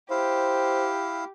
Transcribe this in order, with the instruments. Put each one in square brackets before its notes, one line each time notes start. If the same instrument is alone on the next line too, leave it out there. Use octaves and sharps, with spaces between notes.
[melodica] E4 F5 [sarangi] G4 [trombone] C5